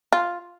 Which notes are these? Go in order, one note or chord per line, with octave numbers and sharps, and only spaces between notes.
F4